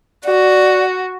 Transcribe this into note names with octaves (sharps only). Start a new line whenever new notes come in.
F#4 D5